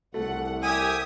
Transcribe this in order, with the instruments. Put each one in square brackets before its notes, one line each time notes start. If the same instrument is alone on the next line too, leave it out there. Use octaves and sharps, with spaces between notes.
[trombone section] C2 [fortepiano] A3 [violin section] F#5
[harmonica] G4 E5 G#5 [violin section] D#6